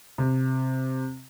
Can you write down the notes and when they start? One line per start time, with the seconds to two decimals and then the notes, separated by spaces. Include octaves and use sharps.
0.18 C3